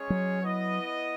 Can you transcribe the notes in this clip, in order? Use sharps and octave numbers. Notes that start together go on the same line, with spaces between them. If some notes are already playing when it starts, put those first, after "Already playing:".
Already playing: G#3 C#4 G#4 C#5
F#3
B3 E4 B4 D#5